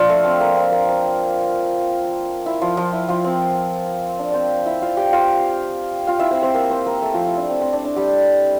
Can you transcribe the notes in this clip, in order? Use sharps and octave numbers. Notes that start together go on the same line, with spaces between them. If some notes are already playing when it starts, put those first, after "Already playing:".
Already playing: F3 D4 F4
A3 A4
C4
A#3
C4
A#3
C4
E4
F3 F4
F3 F4
E4
F3 F4
C4
D4
C4 C5 D5
E4 E5
F4 F5
G4 G5
F4 F5
F4 F5
E4 E5
C4 C5
C4 C5
A#3 A#4
C4 C5
A#3 A#4
A3 A4
F3 F4
E4
D4
C4
C4
D4
D4
G3 G4